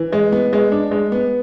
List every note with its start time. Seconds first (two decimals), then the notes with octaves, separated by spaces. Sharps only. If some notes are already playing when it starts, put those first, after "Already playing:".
Already playing: E3
0.13 G#3
0.32 B3
0.53 G#3
0.72 D4
0.91 G#3
1.12 B3